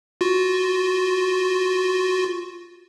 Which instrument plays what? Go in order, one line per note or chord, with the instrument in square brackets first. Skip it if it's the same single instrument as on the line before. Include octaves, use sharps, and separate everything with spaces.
[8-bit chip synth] F4 F#4